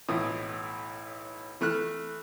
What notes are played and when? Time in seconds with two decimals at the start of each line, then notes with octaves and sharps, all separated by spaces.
0.09 B1 A2 E3 D#6
1.61 E3 A3 F6 F#6